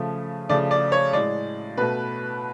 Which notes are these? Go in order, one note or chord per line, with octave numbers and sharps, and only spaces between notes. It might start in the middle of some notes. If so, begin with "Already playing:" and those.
Already playing: C#3 F3 A3
C#3 F3 A3 D5
D5
C#5
A2 G#3 D5
B2 A3 B4